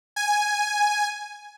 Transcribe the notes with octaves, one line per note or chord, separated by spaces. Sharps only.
G#5